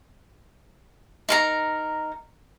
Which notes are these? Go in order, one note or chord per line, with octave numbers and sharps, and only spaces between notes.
D#4 A#4 A#5